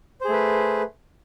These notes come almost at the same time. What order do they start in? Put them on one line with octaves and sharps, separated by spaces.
C5 G#4 A3 B4